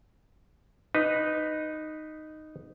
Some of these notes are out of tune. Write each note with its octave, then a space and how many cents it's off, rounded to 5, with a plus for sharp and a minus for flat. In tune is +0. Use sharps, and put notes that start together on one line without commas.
D#4 -5 B4 +0